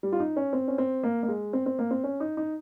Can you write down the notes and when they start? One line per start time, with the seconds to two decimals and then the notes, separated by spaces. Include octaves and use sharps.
0.03 G3
0.12 F4
0.20 D#4
0.36 C#4
0.53 C4
0.68 C#4
0.78 C4
1.03 A#3
1.23 A#3
1.28 G#3
1.53 C4
1.66 C4
1.79 A#3
1.91 C4
2.04 C#4
2.20 D#4
2.37 D#4